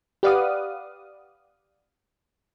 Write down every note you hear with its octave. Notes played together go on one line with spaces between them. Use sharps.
G4 B4 D5 F5 F#5 D#6